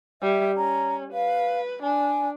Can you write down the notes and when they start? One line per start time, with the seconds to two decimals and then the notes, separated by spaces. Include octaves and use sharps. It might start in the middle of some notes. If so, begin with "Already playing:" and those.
0.22 G3 E5
0.57 C#4 A#5
1.13 B4 F5
1.83 D4 G#5